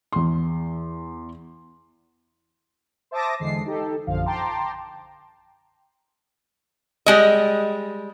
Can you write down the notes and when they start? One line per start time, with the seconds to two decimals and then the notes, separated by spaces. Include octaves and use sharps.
0.12 E2 C6
3.11 C5 E5 A5 D6 D#6 A#6
3.40 E2 D3 G#3 C7
3.65 D#4 G4 A4
4.07 A#1 F#2 D3 F3 F5
4.26 G5 A5 A#5 C6 D6
7.06 G3 G#3 D#5